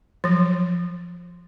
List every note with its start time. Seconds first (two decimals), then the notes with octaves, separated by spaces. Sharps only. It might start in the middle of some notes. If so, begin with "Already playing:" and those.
0.24 F3 F#3